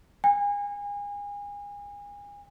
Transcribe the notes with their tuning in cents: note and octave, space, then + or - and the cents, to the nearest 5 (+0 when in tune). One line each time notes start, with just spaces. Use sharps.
G#5 -30